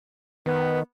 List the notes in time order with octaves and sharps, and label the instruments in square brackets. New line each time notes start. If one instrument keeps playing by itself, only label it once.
[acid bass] D#3 [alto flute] B3